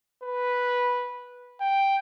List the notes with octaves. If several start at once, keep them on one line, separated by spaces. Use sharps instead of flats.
B4
G5